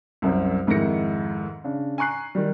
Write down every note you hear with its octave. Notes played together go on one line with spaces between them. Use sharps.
C2 F#2 C4
F2 G#2 D#3 E4 A#6 C#7
C#3 D4
G#5 A#5 C#6 F#6 C7
D#3 G3